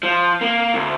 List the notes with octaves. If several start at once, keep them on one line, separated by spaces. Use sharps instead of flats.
F3
A#3
D2